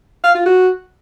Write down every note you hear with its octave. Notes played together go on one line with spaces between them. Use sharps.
F5
F4
F#4